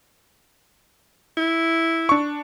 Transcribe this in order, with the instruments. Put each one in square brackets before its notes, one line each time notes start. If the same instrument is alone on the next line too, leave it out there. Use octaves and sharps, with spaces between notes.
[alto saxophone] E4
[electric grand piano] D4 C#6